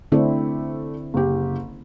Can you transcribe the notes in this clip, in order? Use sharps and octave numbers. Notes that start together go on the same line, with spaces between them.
D3 A3 C4 E4 D5
F#1 G4